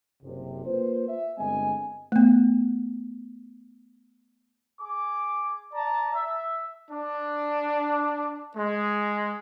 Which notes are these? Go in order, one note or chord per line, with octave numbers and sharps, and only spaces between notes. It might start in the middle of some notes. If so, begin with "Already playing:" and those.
F#1 C3
A#3 F4 B4 C5
E5
G1 G#3 C4 D#5 G#5
A3 B3
G#4 D6
D5 A5 A#5
E5
D4
G#3